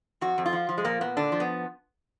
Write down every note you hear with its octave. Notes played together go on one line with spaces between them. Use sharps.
F2 F#4
F2
F4
F3
F3
G#3
A#2 A#3
A#2 B3
D3 D4
F3
B3